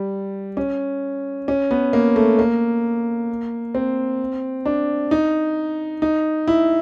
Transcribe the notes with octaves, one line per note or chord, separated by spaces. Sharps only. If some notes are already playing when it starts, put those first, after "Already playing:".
Already playing: G3
C#4
C#4
B3
A#3
A3
A#3
C4
D4
D#4
D#4
E4